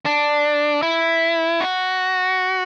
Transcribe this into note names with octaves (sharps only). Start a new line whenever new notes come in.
D4
E4
F#4